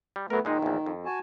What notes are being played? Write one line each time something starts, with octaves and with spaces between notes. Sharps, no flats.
G3
F#3 A3 B3 A#4
A#2 D#3 G#3 D#4
A#1 E2
F2
F#4 G#5 A5